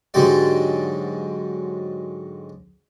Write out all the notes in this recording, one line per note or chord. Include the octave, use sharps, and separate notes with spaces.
G#2 D3 F#3 G#3 G4 D5